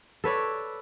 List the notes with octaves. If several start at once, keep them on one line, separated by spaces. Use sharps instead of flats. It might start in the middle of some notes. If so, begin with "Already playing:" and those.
A4 B4 C#5 D5